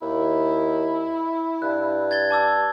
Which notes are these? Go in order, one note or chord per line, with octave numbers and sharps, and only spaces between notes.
D#2 E4
G2 F#6
G#6 A6 G7
A5 D6 E6